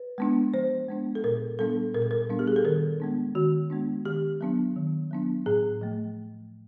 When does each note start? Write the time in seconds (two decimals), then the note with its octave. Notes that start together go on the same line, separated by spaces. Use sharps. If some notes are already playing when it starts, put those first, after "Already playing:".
Already playing: B4
0.18 G#3 B3 D4
0.54 F3 C5
0.88 G#3 B3 D4
1.15 A4
1.24 A#2 A#4
1.59 G3 B3 D4 A4
1.94 A#2 A#4
2.02 A4
2.11 A#4
2.29 G3 B3 D4
2.39 G4
2.48 G#4
2.56 A4
2.65 D#3 A#4
3.00 G#3 B3 D4
3.35 D#3 F#4
3.70 G#3 B3 D4
4.05 D#3 G4
4.41 F#3 B3 D4
4.76 D#3
5.11 F#3 B3 D4
5.46 A2 G#4
5.81 F3 A3